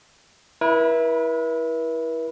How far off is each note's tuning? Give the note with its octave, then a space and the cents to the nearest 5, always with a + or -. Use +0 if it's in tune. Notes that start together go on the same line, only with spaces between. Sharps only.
E4 -5 B4 -45